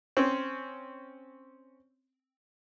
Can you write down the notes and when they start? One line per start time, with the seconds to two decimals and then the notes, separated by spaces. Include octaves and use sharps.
0.17 C4 C#4